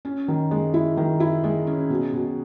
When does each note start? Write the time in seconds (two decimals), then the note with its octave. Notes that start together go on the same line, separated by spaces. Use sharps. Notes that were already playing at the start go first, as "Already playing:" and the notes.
0.05 C#4
0.28 D#3
0.51 G#3
0.74 E4
0.97 D#3
1.20 E4
1.44 G#3
1.67 C#4
1.90 B2
2.13 B2